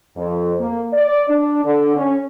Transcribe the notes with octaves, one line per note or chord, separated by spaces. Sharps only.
F2
A#3
D5
D4
D3
C#4